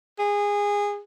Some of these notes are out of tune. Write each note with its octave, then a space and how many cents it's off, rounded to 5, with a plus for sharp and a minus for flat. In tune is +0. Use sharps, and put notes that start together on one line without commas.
G#4 -20